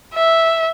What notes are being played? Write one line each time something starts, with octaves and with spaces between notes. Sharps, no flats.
E5